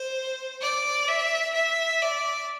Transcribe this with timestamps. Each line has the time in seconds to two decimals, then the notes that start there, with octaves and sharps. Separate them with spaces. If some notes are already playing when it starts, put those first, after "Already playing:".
Already playing: C5
0.62 D5
1.08 E5
1.54 E5
2.02 D5